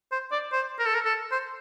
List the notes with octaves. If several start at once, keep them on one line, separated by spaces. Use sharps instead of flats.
C5
D5
C5
A#4
A4
A#4
A4
C5